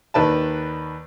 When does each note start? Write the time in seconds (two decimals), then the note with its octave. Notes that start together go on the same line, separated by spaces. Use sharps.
0.14 D#2 D#3 B4 D5 A5